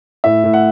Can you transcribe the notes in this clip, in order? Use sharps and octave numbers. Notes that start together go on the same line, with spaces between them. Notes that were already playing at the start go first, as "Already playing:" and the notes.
A2 E5
A2
F#5